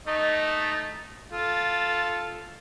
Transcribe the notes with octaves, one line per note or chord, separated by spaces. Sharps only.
A3 D#4 D#5
F4 A4